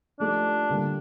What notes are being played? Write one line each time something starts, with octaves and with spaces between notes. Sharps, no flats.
F3 A3 D4 D#4 G4
D3 G3 A#3